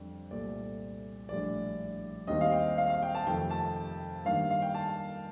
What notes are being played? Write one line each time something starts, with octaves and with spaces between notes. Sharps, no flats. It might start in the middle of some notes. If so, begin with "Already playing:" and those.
Already playing: F2 D3 G3 D4
C2 A#2 A3 D5
A#1 A2 G3 D4 D5
D#2 D#3 G3 C4 D#4 D#5
F5
G5
F5
F5
G5
A5
F2 C3 D#3 A3 G5
A5
G2 D#3 A#3 D4 F5
F5
G5
A5